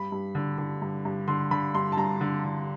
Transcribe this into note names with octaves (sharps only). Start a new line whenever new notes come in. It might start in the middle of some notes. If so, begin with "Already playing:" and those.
Already playing: G2 B5
G2
D3
D3
G2
G2
D3 C6
D3 B5
G2 C6
A5
G2 A#5
D3
D3